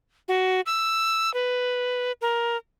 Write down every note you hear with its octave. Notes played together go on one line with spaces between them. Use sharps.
F#4
E6
B4
A#4